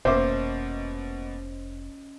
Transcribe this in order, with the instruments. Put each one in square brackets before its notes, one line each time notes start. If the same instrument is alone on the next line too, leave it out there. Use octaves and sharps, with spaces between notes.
[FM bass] F1 [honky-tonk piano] B2 A#3 [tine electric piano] C#4 D#5 [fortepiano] C5 E5 D6